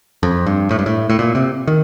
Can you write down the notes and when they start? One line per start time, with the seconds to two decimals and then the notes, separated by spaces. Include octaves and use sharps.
0.23 F2
0.46 G2
0.71 A2
0.79 G2
0.86 A2
1.09 A2
1.19 A#2
1.35 C3
1.67 D#3